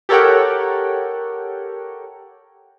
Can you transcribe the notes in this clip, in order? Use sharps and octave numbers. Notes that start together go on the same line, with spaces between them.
G4 A4 A#4 C#5 F#5 G5